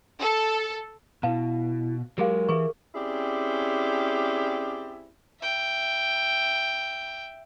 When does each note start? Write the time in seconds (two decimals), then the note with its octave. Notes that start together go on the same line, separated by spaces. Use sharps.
0.21 A4
1.23 B2 E4 B4 F5 A5
2.18 F#3 G#3 G4 G#4 A#4 F5
2.49 E3 G#4 B4 C#6
2.95 C4 C#4 E4 G4 G#4 D5
5.42 E5 G5